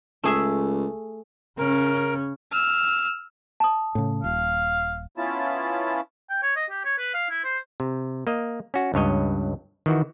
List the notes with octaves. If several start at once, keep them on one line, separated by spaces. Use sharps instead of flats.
C#2 A3 G#4 E5
C#3 C#4 A#4
E6 F6
A5 D#6
A2 C#3
D#1 F5
B3 C#4 E4 F4 A5
G5
C#5
D#5
G4
C#5
B4
F5
E4
C5
C3
A#3 D#5
C#4 F#4
C#2 G2 C#5 D#5
D#3 E3 F#4